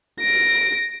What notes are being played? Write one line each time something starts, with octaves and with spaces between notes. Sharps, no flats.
A#6 D7